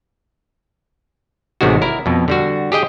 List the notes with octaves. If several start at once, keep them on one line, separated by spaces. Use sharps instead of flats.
A1 C3 D#3 G#3 F#4
E4 A#4
F2 B2
D3 G3 F#4
G4 G#4 D#5 G5